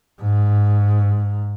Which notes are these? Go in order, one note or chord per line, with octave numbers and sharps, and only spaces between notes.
G#2